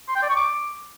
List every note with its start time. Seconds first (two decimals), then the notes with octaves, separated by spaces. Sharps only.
0.09 C6
0.15 G5
0.22 D5
0.29 C#6
0.36 D6